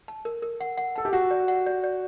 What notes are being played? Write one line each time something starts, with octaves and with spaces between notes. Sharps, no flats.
A5
A#4
A#4
F#5
F#5
A4 A5
G4
F#4 F#5
D5
F#5
D5
D5